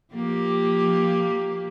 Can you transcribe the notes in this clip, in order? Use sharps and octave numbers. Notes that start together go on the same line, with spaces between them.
F3 A#3 G4